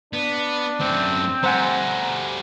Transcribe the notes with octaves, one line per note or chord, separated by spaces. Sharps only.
B3 D4
F#2 A3 C4
G3 A3 C5 F#5 G#5 A#5